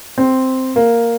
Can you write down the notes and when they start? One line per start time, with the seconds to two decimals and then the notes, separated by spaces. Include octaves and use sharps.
0.18 C4
0.76 A#3